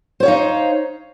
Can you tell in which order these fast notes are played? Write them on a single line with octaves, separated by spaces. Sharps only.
C5 C#5 F5 D#4